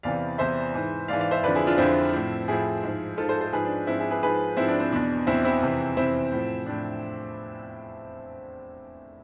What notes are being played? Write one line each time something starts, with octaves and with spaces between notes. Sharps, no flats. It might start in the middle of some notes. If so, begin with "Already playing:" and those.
E2 C3 E3 D5 F5
E2 C3 E3 C5 E5
G#2 E3
G#2 E3 D5 F5
D5 F5
C5 E5
F2 D3 F3 B4 D5
E4 G#4
D4 F4
F2 D3 F3 C4 E4
A2 F3
A2 F3 E4 G#4
G#2 F3
G#2 F3 F4 A4
A4 C5
A4 C5
G#2 F3 G#4 B4
D4
G#2 F3 C4 E4
E4 G#4
G#4 B4
G#2 F3 G#4 B4
G#2 F3 C4 E4
D4
C4
E2 B2 D4
E2 B2 C4 E4
C4 E4
F2 C3 E3
F2 C3 E3 C4 E4
A2 F3
A2 F3 D4